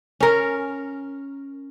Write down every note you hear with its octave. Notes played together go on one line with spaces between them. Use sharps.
C#4 A#4